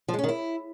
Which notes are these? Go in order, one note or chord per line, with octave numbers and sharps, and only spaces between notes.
F3
G#3
C#4
D#3
E4